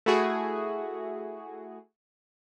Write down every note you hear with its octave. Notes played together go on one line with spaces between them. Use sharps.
A3 E4 F#4 G#4